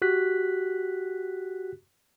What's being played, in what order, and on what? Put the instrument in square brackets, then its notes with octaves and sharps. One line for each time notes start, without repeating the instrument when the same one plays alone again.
[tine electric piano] F#4 G4 F#6 B6